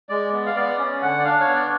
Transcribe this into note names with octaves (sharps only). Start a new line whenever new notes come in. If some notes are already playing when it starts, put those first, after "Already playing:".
G#3 D5
B3
F5
B3 D5
C#4
D3 F#5
D5
D4 F5
C#5
B3
D5